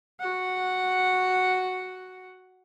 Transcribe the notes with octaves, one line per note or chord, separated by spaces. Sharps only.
F#4 F#5